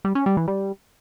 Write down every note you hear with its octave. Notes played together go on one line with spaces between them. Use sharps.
G3
C#4
G3
E3
G3